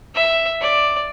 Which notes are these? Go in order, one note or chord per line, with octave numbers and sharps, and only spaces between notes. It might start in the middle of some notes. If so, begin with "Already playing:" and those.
E5
D5